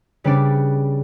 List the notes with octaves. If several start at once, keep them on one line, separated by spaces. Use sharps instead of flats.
C#3 G3 B3 D4 B4 D5